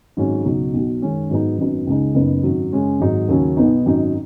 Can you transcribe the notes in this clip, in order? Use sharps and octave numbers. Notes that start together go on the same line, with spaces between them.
G#1 G#2 F#3 C#4
C#2 B2 F#3 D#4
B1 B2 F#3
F#2 D#3 G#3 C#4
G#2 F#3 B3 D#4
G#1 F#2 F#3 B3 D#4
C#2 C#3 G#3 D#4
F#1 F#2 C#3 B3 D#4
G#1 F#2 F#3
F#2 C#3 G#3 C#4
G#1 G#2 F#3 D#4
D#2 C#3 F#3 C#4
B1 B2 B3 D#4
G#1 F#2 F#3 D#4